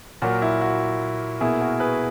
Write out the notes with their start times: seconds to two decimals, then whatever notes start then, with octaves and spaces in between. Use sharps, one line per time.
0.22 A#2 F#3 A#3 F#4
0.42 E4
0.61 F#4
1.41 B2 A#3 E4 G#4
1.61 F#4 A#4
1.80 G#4 B4